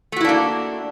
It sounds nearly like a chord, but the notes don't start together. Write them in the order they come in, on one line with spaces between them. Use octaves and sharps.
A3 F#4 E4 D4 A#3